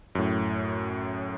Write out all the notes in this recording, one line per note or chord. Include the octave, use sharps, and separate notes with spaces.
F#2 A2